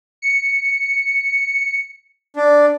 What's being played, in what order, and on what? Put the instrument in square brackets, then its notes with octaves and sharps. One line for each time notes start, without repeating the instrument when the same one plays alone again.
[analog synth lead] C#7
[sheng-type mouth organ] D4